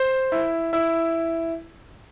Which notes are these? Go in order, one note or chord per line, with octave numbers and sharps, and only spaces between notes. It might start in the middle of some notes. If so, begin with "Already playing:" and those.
Already playing: C5
E4
E4